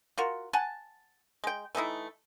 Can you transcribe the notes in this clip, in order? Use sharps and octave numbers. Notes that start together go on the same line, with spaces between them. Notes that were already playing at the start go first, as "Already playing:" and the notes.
F4 F#4 A#4
F#5 G#5 A5
G#3 G5
E3 A3 D#4 E4